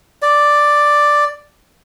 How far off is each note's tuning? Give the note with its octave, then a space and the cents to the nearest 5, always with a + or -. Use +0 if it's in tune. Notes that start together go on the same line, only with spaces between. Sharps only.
D5 +5